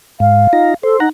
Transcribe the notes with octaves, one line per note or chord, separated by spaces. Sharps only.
G#2 F5
D#4 F4 A#5
A4 C5
D#4 F#5 A#5